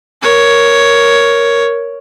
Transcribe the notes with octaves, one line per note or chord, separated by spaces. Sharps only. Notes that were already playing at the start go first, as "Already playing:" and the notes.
A#4 C#5